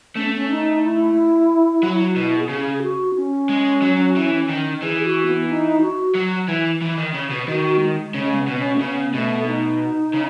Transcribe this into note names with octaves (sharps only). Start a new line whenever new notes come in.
A3 C#4
B3
C#4
D#4
E4
F#3
B2 E4
G#4
C#3
G#4
F#4
C#4
G#3
F#3
E3
D#3
E3 G#4
F#4
B3
D#4
F#4
F#3
E3
E3
D#3
C#3
B2
D#3 F#4
G#3
C#3 G#3
B3
B2
C#4
A3
C#3 B3
B2 A3
D#4
C#3